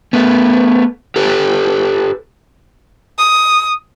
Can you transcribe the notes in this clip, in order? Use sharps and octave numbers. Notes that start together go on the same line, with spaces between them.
A3 B3
G4 A4 B4
D#6